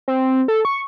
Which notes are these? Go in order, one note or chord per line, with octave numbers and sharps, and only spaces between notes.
C4
A4
C#6